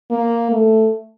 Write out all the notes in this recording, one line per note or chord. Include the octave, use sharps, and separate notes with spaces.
A#3
A3